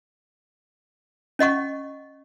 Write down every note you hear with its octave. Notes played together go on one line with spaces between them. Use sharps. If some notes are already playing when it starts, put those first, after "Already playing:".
C#4 D#5 F#5 C#6